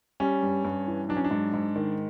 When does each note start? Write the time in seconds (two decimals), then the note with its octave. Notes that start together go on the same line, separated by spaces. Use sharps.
0.20 G3 C#4
0.43 G2
0.65 G2
0.87 E3
1.09 F#3 D4
1.16 C#4
1.24 D4
1.31 G#2
1.53 G#2
1.76 D#3